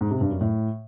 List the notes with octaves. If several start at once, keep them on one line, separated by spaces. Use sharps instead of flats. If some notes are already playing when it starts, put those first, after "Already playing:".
G#2
C3
G2
F#2
A2